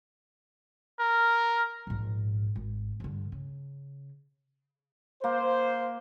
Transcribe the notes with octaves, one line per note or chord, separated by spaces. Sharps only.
A#4
A#1 G#2
G#1
G2 D3
C#3
A#3 C5